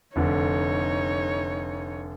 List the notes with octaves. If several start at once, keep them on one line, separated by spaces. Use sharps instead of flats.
F1 D3 D#4 C#5